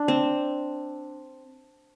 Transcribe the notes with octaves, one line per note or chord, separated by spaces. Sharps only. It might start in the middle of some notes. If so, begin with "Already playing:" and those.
Already playing: D4
C4